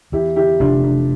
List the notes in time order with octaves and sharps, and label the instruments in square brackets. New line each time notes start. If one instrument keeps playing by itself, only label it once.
[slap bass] E2 [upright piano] E4 G4
[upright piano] E4 G4
[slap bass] F1 [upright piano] D4 F4
[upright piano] D4